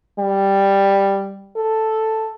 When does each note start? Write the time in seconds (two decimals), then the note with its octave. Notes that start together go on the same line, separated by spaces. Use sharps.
0.19 G3
1.56 A4